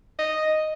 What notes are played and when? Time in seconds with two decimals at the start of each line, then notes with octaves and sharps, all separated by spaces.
0.19 D#5